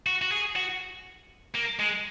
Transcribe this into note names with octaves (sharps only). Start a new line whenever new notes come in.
F#4
F#4
G#4
F#4
A#3
G#3